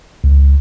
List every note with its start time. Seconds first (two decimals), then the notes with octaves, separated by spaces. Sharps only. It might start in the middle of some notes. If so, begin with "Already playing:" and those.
0.24 C#2